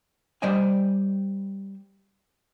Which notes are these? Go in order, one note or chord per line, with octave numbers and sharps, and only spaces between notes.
G3 C5 D5 D#5 G#5